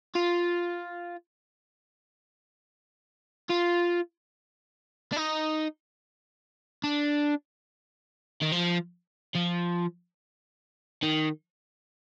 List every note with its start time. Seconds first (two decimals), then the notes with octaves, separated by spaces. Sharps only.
0.15 F4
3.49 F4
5.13 D4
5.17 D#4
6.84 D4
8.42 D#3
8.52 F3
9.35 F3
11.03 D#3